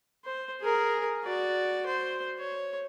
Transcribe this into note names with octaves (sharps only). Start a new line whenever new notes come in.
C5
G#4 A#4
F#4 D5
C5
C#5